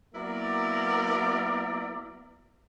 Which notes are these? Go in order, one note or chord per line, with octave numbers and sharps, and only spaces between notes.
F#3 A#3 B3 E4 A#4 D5